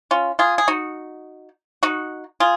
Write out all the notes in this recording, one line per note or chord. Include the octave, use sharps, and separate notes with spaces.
C#4 F4
F4 G#4
G#4
D#4 F#4
D#4 F#4
F4 G#4